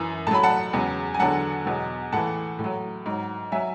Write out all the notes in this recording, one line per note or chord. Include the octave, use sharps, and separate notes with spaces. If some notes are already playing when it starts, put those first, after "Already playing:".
Already playing: F#2 E3
A2 F#3 A5 B5
F#5 A5
E2 C#3 F#3
G#5
E2 D3 F#3 F#5 A5
E2 B2 F#3
A2 E3 F#5 A5
A2
F#3
G#2 F#3
F#3 E5 G#5